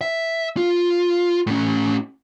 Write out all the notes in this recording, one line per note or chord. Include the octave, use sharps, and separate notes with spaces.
E5
F4
A2 C#4